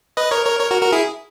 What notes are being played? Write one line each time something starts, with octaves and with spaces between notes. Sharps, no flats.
B4 D#5
A#4 C#5
A#4 C#5
A#4 C#5
F#4 A#4
F#4 A#4
E4 G#4